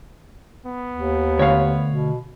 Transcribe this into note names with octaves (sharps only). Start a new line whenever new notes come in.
B3
D#2
D2 C#5 F5
B2